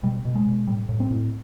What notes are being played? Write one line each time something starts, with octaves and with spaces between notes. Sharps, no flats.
B2 G3
B2
G#3
B2
A2 G3
A2
C4
A2